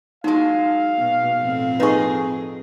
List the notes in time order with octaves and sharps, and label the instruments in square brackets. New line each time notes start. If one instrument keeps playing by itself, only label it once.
[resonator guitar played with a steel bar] F#3 G#3 [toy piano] D#4 A5 [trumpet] F5
[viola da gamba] B2
F2 A2 C4
[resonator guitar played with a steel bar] D#4 G#4 [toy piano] B4 D#5 C#6